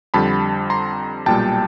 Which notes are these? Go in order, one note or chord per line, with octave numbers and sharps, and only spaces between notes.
F2 D3 G3 A5 B5
A#5 C6
B1 A#2 G3 G5 A5